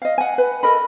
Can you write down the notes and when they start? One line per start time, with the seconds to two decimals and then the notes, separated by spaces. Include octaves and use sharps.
0.02 D#5 F5
0.18 F#5 G#5
0.38 B4
0.63 A4 A#4 D#5 B5